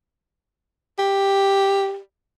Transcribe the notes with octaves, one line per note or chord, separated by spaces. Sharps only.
G4